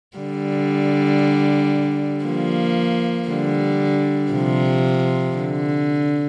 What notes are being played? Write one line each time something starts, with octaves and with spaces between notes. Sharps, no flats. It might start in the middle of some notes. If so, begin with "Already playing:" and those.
D3 G3
F3 A#3
D3 G3
C3 F3
D3